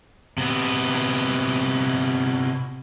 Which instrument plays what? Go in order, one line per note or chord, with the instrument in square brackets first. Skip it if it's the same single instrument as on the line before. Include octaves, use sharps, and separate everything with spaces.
[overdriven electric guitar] C3 B3